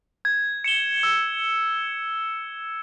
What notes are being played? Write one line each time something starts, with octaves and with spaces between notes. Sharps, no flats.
G#6
C#7 E7 G7
E6